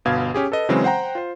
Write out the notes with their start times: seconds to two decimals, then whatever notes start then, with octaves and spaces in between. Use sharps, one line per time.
0.05 G1 B2 F5 G#6
0.34 C#4 G4 G#4
0.52 A4 B4 D#5
0.69 C#3 E3 F#3 G#3 C4 C#4
0.84 C5 F#5 G5 A#5
1.15 F4 C5